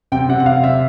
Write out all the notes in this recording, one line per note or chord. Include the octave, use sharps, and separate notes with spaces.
C3 G5
C3 F#5
F#5
C3 F5
C3 E5